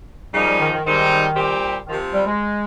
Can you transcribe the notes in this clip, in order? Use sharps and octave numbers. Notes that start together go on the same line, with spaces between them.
C#3 F3 G3 A#3 D#4
G3
D#3
D#3
G#2 D#3 G3 C4 D#4
A#2 G3 C4 G4
C3 D#3 F3 C4
G3
G#3